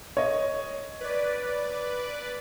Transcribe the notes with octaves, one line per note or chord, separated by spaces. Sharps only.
C#5 D#5
B4 D5